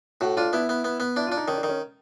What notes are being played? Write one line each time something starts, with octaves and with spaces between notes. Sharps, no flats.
A2 F#4
D4 F4
B3 E4
B3
B3
B3
D4 E4
F4
D4
D#4
D#3 C#4
D4
D#3
C#4